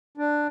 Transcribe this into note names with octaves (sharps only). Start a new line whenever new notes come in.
D4